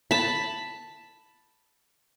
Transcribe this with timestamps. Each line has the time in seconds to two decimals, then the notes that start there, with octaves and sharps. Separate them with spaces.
0.11 A5 B5